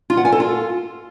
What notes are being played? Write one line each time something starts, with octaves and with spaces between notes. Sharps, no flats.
F4
F#5
G#5
A4
F4